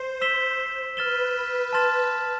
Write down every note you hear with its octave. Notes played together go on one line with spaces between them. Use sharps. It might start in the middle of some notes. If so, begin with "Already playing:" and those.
Already playing: C5
E6 B6 E7 G7
B4 F6 A6 E7 G7
A5 C6 F6 A6 E7